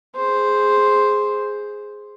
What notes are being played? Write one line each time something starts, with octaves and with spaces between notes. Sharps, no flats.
G#4 C5